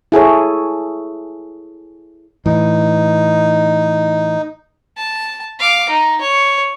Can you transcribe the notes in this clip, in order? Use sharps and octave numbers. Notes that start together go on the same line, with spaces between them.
E4 G#4 A4 C#5
A2 E3 D#4
A5
F5 D6
D#4
C#5